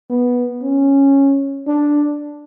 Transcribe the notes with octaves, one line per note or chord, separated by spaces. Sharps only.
B3
C#4
D4